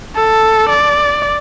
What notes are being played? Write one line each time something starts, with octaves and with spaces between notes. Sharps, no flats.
A4
D5